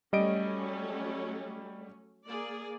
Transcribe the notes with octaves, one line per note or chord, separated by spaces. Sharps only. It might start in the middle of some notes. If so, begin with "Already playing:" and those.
F#3 G3 A3 C#4 D#5 D7
A#3 G#4 D5